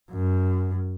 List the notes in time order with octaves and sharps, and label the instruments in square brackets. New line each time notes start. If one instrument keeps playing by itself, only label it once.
[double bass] F#2